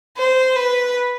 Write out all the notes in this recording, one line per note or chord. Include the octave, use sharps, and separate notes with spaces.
C5
B4